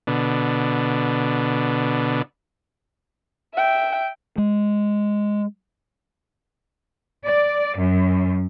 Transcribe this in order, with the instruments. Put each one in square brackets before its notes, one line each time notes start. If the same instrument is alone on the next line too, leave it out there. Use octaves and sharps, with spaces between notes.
[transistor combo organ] B2 D3
[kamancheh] E5 G5
[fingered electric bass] G#3
[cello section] D5
F#2